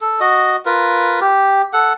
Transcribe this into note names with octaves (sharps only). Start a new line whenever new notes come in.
A4
F#4 D#5
F4 A#4 B4
G4
A4 F#5